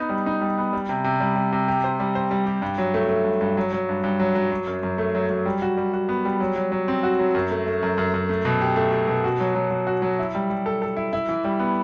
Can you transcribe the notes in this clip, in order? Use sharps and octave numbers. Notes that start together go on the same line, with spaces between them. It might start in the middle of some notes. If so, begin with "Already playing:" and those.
Already playing: B3 D#4
G3
D#4
G3
B3
G3
C3
C3
G3
G3
C3
G4
C5
G3
C5
G3
G4
G2
F#3
A3
A3
G2
G2
F#3
F#3
G2
G2
F#3
F#3
F#3
F#2
F#2
A3
F#3
F#3
G3
F#4
G3
F#4
B3
G3
F#3
F#3
F#3
C4
F#4
F#3
F#2
A3
A3
F#2
F#2
F#2
A3
B2
G4
A3
G4
B2
F#4
F#3
F#3
F#3
F#4
F#3
E4
G3
G3
A4
A4
E4
E4
E3
G3
B3